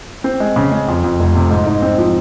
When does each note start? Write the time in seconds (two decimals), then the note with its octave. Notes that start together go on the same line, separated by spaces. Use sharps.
0.24 C4
0.40 G#3
0.56 C#3
0.71 G#3
0.88 F2
1.04 F2
1.20 F1
1.35 C3
1.51 G#2
1.66 D#4
1.82 C4
1.98 F3